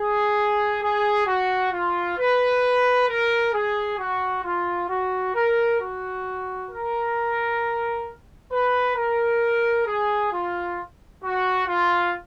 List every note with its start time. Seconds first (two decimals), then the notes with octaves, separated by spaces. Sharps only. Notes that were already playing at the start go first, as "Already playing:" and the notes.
Already playing: G#4
0.83 G#4
1.27 F#4
1.73 F4
2.18 B4
3.09 A#4
3.54 G#4
3.99 F#4
4.44 F4
4.89 F#4
5.34 A#4
5.81 F#4
6.71 A#4
8.52 B4
8.97 A#4
9.87 G#4
10.33 F4
11.24 F#4
11.68 F4